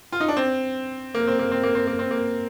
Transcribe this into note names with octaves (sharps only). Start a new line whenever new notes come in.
F4
D#4
D4
C4
A#3
C4
A#3
C4
A#3
C4
A#3
C4
A#3